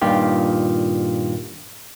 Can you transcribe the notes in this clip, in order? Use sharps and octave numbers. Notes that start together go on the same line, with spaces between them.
G2 A#2 D#3 F4 G4